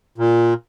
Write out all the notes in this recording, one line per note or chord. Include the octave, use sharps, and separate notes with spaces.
A#2